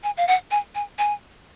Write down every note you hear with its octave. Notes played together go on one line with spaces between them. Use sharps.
G#5
F5
F#5
G#5
G#5
G#5